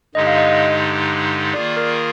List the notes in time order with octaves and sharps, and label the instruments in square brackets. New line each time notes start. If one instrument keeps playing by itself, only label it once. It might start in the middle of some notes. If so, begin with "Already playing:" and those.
[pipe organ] G2 D3 G#3 D#4 G4 [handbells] D#5
[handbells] F5
D#5
[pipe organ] D#3 A#3 F4 G#4 [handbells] D5
[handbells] A#4